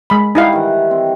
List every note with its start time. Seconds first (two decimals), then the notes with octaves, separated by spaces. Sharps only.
0.10 G#3 B5
0.35 G3 D#4 E4 F5 F#5
0.53 D#3 E3
0.91 C4